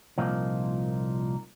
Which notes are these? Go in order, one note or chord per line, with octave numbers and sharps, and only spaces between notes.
C2 A#2 F3 A#3 D#4